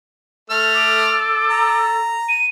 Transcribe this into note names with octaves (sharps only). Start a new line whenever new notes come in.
A3 A4 F6
D6
A#5
D#7